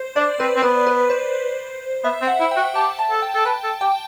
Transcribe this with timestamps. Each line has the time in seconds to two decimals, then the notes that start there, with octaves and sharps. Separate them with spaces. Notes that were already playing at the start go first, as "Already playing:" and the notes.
Already playing: C5
0.16 D4 D5
0.40 C4 B4
0.56 C4
0.62 B3 B4
0.87 B4
1.10 C5
2.04 B3 E5
2.22 C4
2.27 F#5
2.40 E4
2.51 G5
2.57 F#4
2.75 G4 A5
2.99 A5
3.11 A4
3.22 G5
3.35 A4
3.45 B4 A5
3.64 A4
3.81 G4 G5